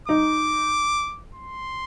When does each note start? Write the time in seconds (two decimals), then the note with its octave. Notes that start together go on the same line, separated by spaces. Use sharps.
0.08 D#4 D6
1.35 C6